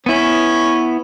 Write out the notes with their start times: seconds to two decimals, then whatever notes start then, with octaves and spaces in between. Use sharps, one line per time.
0.06 B3 C#4 E4